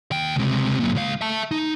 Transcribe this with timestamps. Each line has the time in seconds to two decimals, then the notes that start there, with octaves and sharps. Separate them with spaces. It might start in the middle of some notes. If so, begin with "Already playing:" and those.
0.11 D#2 G5
0.36 C#2 C3
0.80 F#2 A#2
0.95 C#2 F5
1.21 E5 A5
1.51 D#4